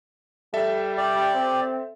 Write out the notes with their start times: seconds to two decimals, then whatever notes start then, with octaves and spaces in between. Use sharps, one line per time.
0.54 G3 A4 E5
0.97 G4 D5
1.34 C4